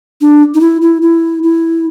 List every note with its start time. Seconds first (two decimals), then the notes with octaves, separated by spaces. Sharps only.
0.21 D4
0.55 D#4
0.61 E4
0.82 E4
1.02 E4
1.43 E4